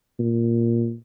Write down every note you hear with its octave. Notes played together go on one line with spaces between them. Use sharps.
A#2